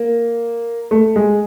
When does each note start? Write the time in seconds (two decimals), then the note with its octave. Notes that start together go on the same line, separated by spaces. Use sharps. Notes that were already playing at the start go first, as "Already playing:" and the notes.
Already playing: A#3
0.91 A3
1.16 G#3